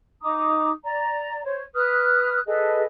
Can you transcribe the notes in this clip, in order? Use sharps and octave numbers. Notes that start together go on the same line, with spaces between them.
D#4 A#5 D6 D#6
D5 A#5
C5 C#5
B4 D#6 F6 F#6
G#4 A4 B4 D#5